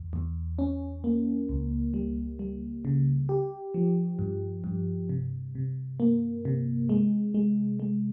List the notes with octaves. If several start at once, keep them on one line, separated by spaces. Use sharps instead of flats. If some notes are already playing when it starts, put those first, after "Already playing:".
Already playing: E2
E2
C#4
A#3
C#2
G3
G3
C#3
G4
F3
G2
G2
C3
C3
A#3
C3
G#3
G#3
G#3